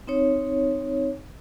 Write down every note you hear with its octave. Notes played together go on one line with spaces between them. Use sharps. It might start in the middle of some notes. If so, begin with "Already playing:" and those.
C4 D#4 C#5